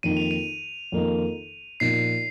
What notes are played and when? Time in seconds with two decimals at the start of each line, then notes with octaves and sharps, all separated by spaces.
0.03 F2 D#3 A#3 D#4 D#7
0.17 F7
0.31 D#7
0.92 F2 D#3 A#3 D#4
1.80 A#2 F3 D#4 C7